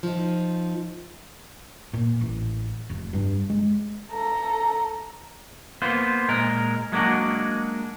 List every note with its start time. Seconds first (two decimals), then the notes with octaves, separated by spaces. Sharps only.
0.03 F3 D#4
1.93 A#2
2.21 A1
2.90 F1
3.13 G2
3.50 G#3
4.11 A4 A#5
5.82 A#3 B3 F4 C5
6.28 A#2 G#3 A#4
6.92 F#3 G#3 A#3 D4 F#4